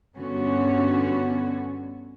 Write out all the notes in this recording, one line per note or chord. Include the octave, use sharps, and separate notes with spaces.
G2 D3 B3 C#4 F#4